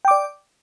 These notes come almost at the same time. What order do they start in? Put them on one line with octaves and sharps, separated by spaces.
G5 D6 D5